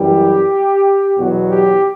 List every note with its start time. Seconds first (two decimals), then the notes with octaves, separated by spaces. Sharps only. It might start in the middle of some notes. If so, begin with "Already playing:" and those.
Already playing: F#2 E3 G3 G4
1.18 E2 B2 F#3 F#4
1.51 G4